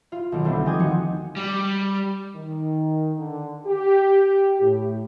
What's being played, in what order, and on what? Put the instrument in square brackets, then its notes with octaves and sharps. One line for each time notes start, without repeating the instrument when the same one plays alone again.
[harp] F4 F5
B1 D#3 D7
D3 G3 A3 B3 C4 D4
F3 G#3 D#5 G5 G#5 D6
D#2 F3 D#4 F#4 C#6 C#7
[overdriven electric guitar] G3
[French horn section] D#3
D3
G4
A2